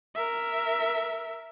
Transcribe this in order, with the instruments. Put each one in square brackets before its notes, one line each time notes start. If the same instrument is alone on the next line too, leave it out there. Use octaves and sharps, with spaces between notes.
[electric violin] A#4 E5